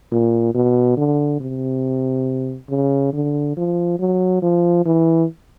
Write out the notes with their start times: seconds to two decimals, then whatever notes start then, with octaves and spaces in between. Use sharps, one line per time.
0.12 A#2
0.55 B2
0.97 D3
1.40 C3
2.69 C#3
3.13 D3
3.57 F3
3.99 F#3
4.42 F3
4.85 E3